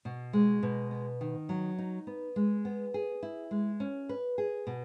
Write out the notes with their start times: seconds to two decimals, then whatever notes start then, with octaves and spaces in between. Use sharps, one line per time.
0.05 B2
0.33 G#3
0.63 B2
0.91 B3
1.21 D#3
1.49 F#3
1.78 D#4
2.07 B3
2.36 G#3
2.65 B3
2.94 G#4
3.23 E4
3.51 G#3
3.80 C#4
4.09 B4
4.38 G#4
4.67 B2